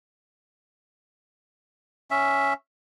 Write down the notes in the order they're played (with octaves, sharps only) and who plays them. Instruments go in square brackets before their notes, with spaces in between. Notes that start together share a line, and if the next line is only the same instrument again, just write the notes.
[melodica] C#4 E5